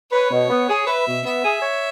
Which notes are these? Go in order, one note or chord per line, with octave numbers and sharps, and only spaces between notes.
B4 C#5
B2
B3
G#4
B4 E5
B2
B3 E5
G#4
C#5